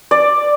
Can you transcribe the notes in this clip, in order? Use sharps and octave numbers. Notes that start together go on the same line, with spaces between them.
D5